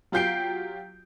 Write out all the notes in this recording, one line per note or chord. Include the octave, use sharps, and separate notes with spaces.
F#3 F4 G4 G6 C7 D7